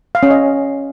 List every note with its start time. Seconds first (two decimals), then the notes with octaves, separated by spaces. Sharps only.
0.15 F5
0.23 C#4
0.31 D#5